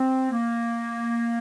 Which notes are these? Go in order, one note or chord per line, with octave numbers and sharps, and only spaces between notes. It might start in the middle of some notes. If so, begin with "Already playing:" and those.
Already playing: C4
A#3